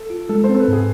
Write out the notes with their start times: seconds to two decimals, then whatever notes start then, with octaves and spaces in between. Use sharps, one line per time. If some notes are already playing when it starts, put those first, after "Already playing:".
Already playing: A4
0.10 F4
0.29 G#3 A4
0.44 C5
0.49 C4
0.54 A4
0.59 B4
0.68 G#2 G#4